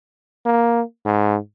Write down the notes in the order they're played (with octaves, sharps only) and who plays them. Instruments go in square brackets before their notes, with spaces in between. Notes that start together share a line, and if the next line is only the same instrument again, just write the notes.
[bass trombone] A#3
G#2